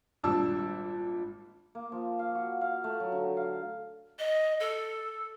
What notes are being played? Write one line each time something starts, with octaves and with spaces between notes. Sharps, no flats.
G#1 A#2 G3 D4 A5 E6
A#3
F3
F5
F#4
F5
A3
F#3
D3
F5
D#5
A4